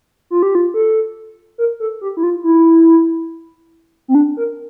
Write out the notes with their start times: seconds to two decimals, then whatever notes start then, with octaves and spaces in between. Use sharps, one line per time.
0.31 F4
0.43 G4
0.55 F4
0.74 A4
1.58 A#4
1.80 A4
2.01 G4
2.17 E4
2.23 F4
2.44 E4
4.08 C4
4.15 D4
4.37 A#4